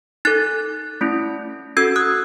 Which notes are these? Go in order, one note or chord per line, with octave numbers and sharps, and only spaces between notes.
D#4 A4 F#6 A6
A3 C#4 E4
C#4 F#4 A4 E6 G#6
D#6 F#6